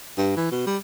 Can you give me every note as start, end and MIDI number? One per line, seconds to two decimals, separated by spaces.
0.18 0.33 43
0.36 0.47 52
0.51 0.66 47
0.67 0.77 55